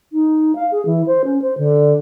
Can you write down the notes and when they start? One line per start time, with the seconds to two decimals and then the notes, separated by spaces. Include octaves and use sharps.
0.13 D#4
0.55 F5
0.72 G#4
0.86 E3
1.07 C5
1.25 C#4
1.42 C5
1.58 D3